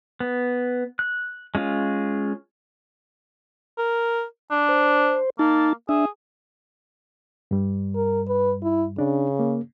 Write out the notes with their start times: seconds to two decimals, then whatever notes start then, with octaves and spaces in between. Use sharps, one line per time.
0.20 B3
0.99 F#6
1.55 G#3 C#4 F4
3.78 A#4
4.51 D4
4.69 C5
5.39 A#3 D#4 A5
5.89 D4 G#4 E5
7.51 G2 G3
7.95 A#4
8.28 B4
8.63 E4
8.98 C#3 D4
9.39 A#3